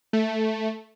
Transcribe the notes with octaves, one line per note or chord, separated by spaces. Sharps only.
A3